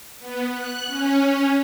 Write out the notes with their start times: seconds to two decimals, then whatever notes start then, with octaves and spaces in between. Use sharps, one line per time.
0.19 B3
0.52 F#6
0.87 C#4